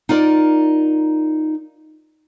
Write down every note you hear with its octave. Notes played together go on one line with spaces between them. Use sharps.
D#4 F4 A#4 D5